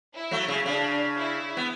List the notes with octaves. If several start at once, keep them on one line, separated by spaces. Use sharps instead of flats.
E4
F#3 A3
C#3
C#3 D4
E4
B3